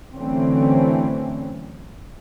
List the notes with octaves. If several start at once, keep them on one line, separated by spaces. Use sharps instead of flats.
D3 E3 F#3 A3 C4 C#4